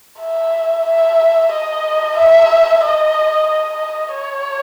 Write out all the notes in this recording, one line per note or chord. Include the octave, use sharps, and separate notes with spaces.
E5
E5
D#5
E5
D#5
D#5
C#5